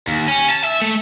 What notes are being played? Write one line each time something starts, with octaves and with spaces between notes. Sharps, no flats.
D#2
C#4
A5
E5
A3